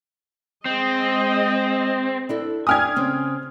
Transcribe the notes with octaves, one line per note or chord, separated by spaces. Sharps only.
G#3 C4 D#5
D4 E4 A4
D4 G5 G#5 D#6 F6 G#6
C#3 C4 C#4